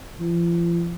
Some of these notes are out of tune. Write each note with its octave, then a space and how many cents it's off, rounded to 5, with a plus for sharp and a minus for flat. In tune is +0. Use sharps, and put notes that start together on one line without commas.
F3 -40